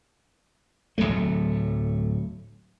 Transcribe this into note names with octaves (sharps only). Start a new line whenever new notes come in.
D1 G#1 F#3 A3